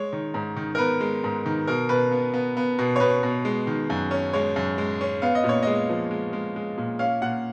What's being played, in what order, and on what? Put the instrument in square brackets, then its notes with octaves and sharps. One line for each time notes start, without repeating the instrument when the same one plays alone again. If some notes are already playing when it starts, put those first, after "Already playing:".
Already playing: [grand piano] G#3 C#5
D#3
G#2
D#3
A#4
B3 B4
G#3
G#2
D#3
B2 A#4
B2 B4
B3
B3
B3
B2
C#5
B2 B4
B2
G#3
D#3
F#2
C#4
G#3 C#5
F#2
G#3
C#4
B3 F5
D#5
A#2
C#5
G#3 D#5
F3
G#3
G#3
G#3
A#2
C#4 F5
A#2 F#5